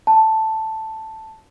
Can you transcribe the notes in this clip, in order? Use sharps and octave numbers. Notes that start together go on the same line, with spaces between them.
A5